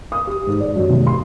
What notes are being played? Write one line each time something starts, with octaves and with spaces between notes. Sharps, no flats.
D#6
G4
G#2
D5
F#2
F1
C6